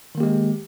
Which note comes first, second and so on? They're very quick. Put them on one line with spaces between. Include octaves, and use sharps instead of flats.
D#3 A#3 G4 G#3